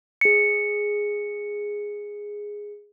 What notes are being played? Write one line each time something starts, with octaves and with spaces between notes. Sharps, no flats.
G#4 C#7